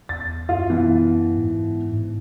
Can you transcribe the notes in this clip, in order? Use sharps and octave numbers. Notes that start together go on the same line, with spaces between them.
E2 A6
F#2 F4 F5
B2 E3
G#2
G#2